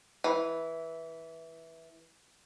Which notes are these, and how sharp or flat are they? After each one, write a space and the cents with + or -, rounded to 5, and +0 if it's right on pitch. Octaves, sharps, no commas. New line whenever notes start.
E3 -10